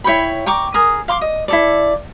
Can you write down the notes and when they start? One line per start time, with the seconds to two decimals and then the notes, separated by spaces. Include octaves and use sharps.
0.04 E4 C#5 G5 B5
0.46 G5 A#5 C#6 D6
0.74 G#4 A#4 D#6
1.08 F5 C6 D6
1.21 D#5
1.48 E4 A4 D5